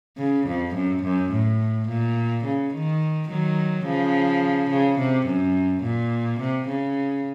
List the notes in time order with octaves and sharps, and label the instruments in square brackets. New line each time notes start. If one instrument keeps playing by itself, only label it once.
[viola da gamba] C#3
F2
F#2
F#2
A2
A#2
C#3
D#3
D#3 F#3
C#3 F3
C#3
C3
F#2
A#2
C3
C#3